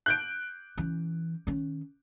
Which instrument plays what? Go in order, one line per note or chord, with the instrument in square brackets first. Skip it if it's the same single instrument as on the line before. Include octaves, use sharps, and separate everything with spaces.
[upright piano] F#6 G6 D7
[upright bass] E3 C#4
D#3 C#4